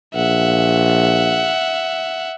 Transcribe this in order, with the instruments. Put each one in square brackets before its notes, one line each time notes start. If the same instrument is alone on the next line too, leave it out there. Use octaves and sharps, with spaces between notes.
[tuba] A#1 [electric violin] E5 F#5